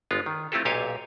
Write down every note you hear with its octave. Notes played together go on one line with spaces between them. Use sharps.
G1 G#3 B3 F4
D#3
A3 C4 E4 F4 G4 A4
B1 A#2 G4 C#5 F5 G#5